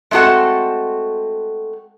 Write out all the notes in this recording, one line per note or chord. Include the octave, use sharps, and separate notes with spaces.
G#3 A3 C4 F#4 A4 F#5